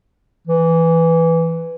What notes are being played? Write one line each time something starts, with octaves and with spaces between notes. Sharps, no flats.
E3